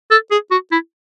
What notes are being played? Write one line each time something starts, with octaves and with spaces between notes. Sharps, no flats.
A4
G#4
F#4
E4